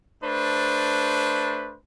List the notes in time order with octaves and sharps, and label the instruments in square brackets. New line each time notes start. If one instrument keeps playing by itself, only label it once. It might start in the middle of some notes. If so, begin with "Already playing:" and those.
[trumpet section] A3 D4 B4 C5